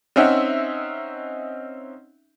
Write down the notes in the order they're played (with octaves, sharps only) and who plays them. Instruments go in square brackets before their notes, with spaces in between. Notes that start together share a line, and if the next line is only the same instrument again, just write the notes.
[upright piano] C4 C#4 D#4 E5 F#5